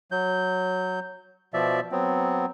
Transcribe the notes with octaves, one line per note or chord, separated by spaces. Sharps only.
F#3 G6
B2 F3 D5 E5
F#3 B3 C4